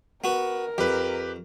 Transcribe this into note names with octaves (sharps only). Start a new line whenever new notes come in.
B3 F#4 A#4
F2 G4 B4